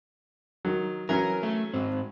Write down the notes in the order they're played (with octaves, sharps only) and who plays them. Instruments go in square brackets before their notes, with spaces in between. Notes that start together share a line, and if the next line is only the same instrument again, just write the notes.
[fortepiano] D#3 F#3
[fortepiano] E3 F#3 C#4 [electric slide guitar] A#4
[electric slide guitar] A3
G#2 C4